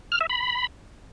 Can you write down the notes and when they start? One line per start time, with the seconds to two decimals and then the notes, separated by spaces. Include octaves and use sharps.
0.12 F6
0.21 E5
0.30 B5